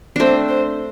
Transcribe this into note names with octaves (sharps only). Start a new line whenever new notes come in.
A3 C4 D4 C5
C5